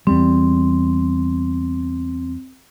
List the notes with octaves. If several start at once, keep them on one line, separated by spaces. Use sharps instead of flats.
E2 G3 C4